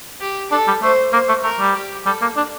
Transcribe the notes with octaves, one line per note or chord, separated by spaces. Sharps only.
G4
D4 A4
G3
A3 C5
A#3 C5
A3
A3 A#4
G3
G4
G3 A4
A#3
D4